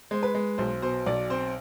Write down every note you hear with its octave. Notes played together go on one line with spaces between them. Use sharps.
G#3 C5
B4
G#3
B1 C5
B2 C5
B1 D5
C4 C5